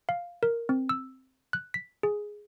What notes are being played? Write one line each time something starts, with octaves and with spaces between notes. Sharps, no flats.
F5
A#4
C4
E6
F#6
B6
G#4